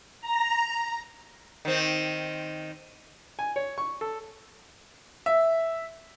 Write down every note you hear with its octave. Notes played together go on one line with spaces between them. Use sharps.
A#5
D#3 C4
G#5
C#5
C#6
A4
E5